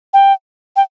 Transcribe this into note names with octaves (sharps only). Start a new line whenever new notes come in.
G5
G5